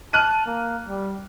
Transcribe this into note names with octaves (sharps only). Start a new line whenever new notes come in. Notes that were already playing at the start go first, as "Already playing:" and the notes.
A5 F6 F#6 D#7
A#3
G3